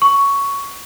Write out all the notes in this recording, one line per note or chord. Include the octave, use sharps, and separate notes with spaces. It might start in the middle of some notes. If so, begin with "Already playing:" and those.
C#6